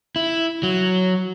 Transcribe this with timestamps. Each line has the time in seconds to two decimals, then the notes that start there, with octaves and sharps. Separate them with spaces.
0.16 E4
0.63 F#3